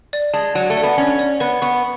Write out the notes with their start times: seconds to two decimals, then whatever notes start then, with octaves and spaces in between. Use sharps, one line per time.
0.13 D5
0.34 G#3 A5
0.55 F#3 D5
0.70 A3
0.77 D5
0.83 B3
0.98 C#4 D5
1.19 D5
1.40 B3 B4
1.62 B3 C#6